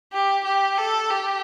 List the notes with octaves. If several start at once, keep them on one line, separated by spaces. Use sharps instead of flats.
G4
G4
A4
G4